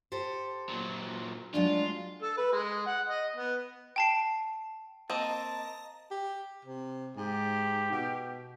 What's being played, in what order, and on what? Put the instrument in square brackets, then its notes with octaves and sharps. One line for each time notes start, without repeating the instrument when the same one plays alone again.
[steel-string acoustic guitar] G4 A4 C5
[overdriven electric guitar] A#2 F#3
[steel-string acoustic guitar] F#3 G#3 A3 [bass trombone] D4 [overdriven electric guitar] F4
[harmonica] A4
B4
G#3
F#5
D#5
B3
[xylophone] G5 A5 C7
[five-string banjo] A#3 C4 [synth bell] D#5 A#5 [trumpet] A5
[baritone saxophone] G4
C3
[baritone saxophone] G#2 [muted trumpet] G4
[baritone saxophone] B2